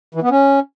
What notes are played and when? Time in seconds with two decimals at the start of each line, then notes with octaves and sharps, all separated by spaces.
0.14 E3
0.22 B3
0.30 C#4